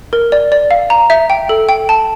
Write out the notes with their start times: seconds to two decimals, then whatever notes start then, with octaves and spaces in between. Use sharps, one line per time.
0.13 A#4
0.32 D5
0.52 D5
0.71 F5
0.90 A#5
1.10 E5
1.30 G5
1.49 A4
1.69 G5
1.89 A5